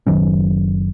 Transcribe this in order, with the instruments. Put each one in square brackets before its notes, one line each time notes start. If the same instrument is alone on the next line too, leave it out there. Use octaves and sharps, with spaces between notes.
[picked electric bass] F#1 D#3 F#3 C#4